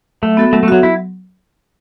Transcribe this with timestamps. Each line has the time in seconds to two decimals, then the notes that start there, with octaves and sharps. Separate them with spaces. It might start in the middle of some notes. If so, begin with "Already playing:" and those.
0.22 F#3 A3
0.37 B3 F#4 A4 E5
0.53 F#3 A3
0.63 A3
0.67 F#3 B3 F#4 A4 E5
0.82 F#3 E4